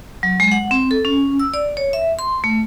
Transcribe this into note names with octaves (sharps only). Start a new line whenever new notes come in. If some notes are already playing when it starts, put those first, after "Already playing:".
F#3
G#3
F#5
C4
A4
C#4
E6
D5
C#5
E5
C6
A3